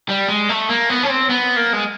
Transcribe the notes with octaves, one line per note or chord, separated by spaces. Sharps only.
G3
G#3
A3
A#3
B3
C#4
C4
B3
A#3
G#3